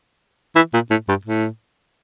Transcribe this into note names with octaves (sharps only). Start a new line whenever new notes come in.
E3
A#2
A2
G2
A2